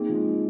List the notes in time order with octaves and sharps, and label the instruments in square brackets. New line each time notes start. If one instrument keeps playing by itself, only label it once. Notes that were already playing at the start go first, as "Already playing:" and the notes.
Already playing: [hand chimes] A#3 D#4 G#4 [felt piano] C4
[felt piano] F3
G#3